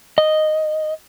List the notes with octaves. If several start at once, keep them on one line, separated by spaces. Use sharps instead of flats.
D#5